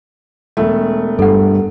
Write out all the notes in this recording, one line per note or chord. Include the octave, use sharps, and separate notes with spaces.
E1 A3
G2 A4 F#5